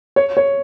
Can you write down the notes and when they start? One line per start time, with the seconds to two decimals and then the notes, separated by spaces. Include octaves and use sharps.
0.16 C#5
0.37 C#5